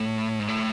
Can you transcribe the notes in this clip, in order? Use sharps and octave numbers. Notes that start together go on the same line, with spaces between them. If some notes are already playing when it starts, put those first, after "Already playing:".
Already playing: A2
G#2
A2